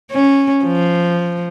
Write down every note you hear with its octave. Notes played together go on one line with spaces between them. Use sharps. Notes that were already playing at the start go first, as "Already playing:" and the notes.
C#4
F3